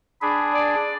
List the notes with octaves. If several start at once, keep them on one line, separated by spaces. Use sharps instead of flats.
D4 G#4 B5
D5